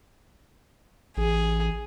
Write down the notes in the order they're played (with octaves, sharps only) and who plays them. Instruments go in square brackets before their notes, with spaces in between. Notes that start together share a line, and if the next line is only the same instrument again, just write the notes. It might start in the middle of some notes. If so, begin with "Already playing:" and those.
[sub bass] A1 [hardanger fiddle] G#4